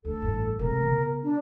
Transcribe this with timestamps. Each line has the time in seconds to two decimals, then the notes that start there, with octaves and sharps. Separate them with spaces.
0.05 D2 A4
0.22 A1 G2
0.59 C3 G#3 A#4
0.81 C#3 B3
1.23 D4